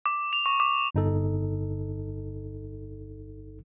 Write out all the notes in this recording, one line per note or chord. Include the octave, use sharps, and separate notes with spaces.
D6
F7
C#6
D6
G1 D#4 A4